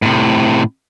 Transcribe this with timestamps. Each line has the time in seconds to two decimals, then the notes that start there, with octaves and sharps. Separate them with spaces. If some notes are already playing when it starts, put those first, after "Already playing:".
0.02 A2 C3